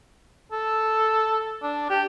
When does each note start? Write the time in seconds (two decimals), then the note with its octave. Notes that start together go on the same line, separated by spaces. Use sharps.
0.52 A4
1.62 D4
1.89 G4